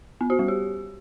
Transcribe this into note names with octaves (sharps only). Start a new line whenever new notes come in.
B3
F#4
G3
G4